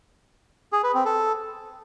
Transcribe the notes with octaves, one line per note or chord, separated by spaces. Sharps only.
G#4
B4
C4
A4